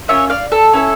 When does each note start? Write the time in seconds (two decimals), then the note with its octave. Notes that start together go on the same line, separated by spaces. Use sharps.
0.08 A#3 C#4 F4 C#5 E5
0.30 D5 F5
0.52 A4
0.73 C#4 E4 A4